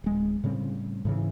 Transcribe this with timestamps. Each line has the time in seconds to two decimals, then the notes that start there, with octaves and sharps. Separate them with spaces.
0.04 D1 G#3
0.44 A2 C#3 G3 C4
1.05 G#2 C#3 E3